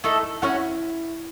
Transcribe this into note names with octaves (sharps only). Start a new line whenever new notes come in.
A3 D#4 E4 A4
D#4
C#4 E4 F#4 C#5 F#5